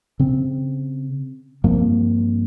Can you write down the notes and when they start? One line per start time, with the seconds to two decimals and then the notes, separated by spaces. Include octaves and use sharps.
0.19 C#3 C4
1.64 G2 F3 A#3 C4